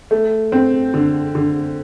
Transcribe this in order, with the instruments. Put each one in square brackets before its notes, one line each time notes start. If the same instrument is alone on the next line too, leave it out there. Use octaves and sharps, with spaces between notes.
[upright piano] A3
C4
D3
D3